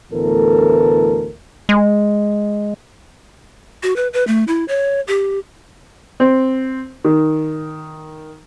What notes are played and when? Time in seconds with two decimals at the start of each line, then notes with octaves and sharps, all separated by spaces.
0.12 D2 A2 E3 B3 A4 A#4
1.69 G#3
3.83 F#4
3.96 B4
4.13 B4
4.27 A3
4.48 E4
4.68 C#5
5.08 G4
6.20 C4
7.04 D#3